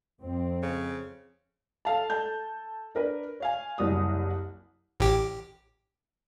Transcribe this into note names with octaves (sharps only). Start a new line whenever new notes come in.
F2 C4
C#3
A4 F5 A5
A4 A5 G6
D4 A#4 B4
C#5 F5 G#5
F#1 C2 F#4 D#6
A1 G4